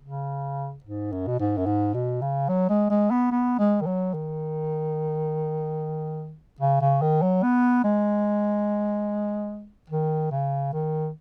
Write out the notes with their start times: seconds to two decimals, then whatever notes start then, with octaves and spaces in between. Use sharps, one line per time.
0.02 C#3
0.84 G#2
1.12 F#2
1.27 B2
1.39 G#2
1.57 F#2
1.66 G#2
1.94 B2
2.21 C#3
2.49 F#3
2.69 G#3
2.90 G#3
3.11 B3
3.31 B3
3.59 G#3
3.81 D#3
3.86 F#3
4.14 D#3
6.61 C#3
6.81 C#3
7.02 D#3
7.22 F#3
7.43 B3
7.84 G#3
9.90 D#3
10.31 C#3
10.73 D#3